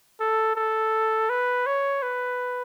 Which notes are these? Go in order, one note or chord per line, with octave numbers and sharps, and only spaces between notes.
A4
A4
B4
C#5
B4